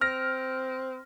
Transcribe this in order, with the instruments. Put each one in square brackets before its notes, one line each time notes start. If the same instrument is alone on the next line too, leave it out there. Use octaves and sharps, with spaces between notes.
[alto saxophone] C4 [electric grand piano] F6 A#6